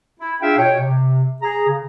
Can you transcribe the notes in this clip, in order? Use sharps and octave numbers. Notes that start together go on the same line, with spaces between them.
E4
D4 F4 G#4 E5 F5 G5
B2 C#5 G5
C3
G#4 A#5
C#3